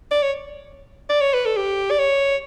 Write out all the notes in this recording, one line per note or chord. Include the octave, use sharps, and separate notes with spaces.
D5
C#5
D5
C#5
B4
A4
G4
D5
C#5